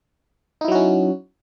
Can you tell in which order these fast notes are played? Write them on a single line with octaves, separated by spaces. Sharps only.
D#4 E4 F#3 F#4 C#4